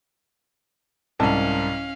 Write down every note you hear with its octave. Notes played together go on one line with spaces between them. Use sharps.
C2 G#2 C#4 F5 A5